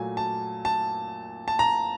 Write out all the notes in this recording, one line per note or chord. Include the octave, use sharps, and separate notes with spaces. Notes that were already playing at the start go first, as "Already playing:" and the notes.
Already playing: A#2 F#3 A3 G#5
A5
A5
A5
A#5